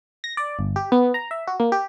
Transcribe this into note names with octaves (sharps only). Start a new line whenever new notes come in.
A#6
D5
G1
G4
B3
A#5
E5
F#4
A#3
G4